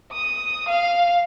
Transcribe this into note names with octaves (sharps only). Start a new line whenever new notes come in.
D#6
F5